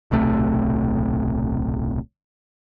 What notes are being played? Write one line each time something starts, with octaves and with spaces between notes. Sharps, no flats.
D1 B1 C3 A3